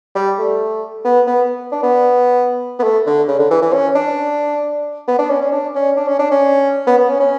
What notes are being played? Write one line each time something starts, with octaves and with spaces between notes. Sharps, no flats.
G3
A3
B3
B3
D4
B3
B3
A3
D3
C#3
D3
E3
E3
C#4
D4
B3
D4
C#4
C#4
D4
C#4
D4
C#4
D4
C#4
B3
B3
C#4
C#4